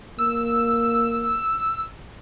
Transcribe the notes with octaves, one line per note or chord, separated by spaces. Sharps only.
A#3 E6